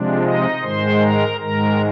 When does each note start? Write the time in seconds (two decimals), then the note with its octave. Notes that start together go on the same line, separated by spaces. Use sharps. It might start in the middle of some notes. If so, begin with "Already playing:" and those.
Already playing: C3 F3 G#3 D4
0.22 D#4 D#5
0.62 G#2 D#3 G#3 C5 C6
1.01 A#4 A#5
1.40 G#2 D#3 G#3 A#4 A#5